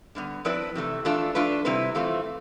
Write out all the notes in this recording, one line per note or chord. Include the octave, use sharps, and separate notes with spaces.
D3 G3 B3
F3 C4 E4 B4 D5
C3 E3 A3
E3 A3 D4 F4 A4
F3 A3 D4 F4 B4
C3 G3 C4 E4 B4
E3 A3 C4 F4